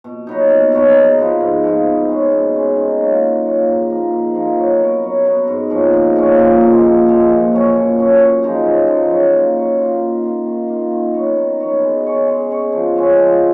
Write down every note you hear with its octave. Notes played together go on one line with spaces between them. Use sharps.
B2
F#3 B3 D#4
B2
F#3 B3 D#4
G#2
F3 B3 F4
G#2
F3 B3 F4
B2
G#3 C#4
B2
G#3 C#4
D#3
F#3 A#3 F4
D#3
F#3 A#3 F4
G#2
F3 A#3 D#4
G#2
F3 A#3 D#4
F#3
B3 F#4 A#4
F#3
B3 F#4 A#4
G#2
F3 A#3 C#4
G#2
F3 A#3 C#4
A#2
F3 G#3
A#2
F3 G#3
A#2
F#3 C#4
A#2
F#3 C#4
F#2
F3 G#3 D#4
F#2
F3 G#3 D#4
F#3
A#3 F4
F#3
A#3 F4
D#3
A#3 F4
D#3
A#3 F4
D#3
F#3 B3 F#4
D#3
F#3 B3 F#4
G#3
C#4 G#4 C#5
G#3
C#4 G#4 C#5
F3
G#3 C#4
F3